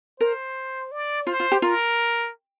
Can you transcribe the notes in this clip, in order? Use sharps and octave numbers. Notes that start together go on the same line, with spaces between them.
A#4 C5
D5
F4 C5
F4
G4
F4 A#4